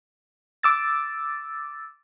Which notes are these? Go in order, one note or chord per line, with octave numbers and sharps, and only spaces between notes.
D6 E6 A6